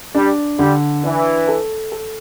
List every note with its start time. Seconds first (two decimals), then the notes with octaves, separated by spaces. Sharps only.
0.15 G3 D4
0.59 D3 G3
1.03 E3 D4
1.48 A4
1.92 A4